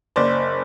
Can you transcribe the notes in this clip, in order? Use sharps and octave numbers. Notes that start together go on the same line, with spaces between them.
F#1 C5 D5